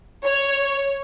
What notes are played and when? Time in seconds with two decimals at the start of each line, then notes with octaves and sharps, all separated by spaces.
0.25 C#5